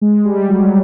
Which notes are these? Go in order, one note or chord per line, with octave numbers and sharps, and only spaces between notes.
G#3
G3
F#3